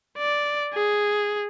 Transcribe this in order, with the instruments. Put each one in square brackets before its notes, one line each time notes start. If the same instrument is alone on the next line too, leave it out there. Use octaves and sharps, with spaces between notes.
[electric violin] D5
G#4